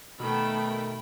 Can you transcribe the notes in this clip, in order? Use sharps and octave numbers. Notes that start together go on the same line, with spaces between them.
B2 D#3 A3 A4 G5 B5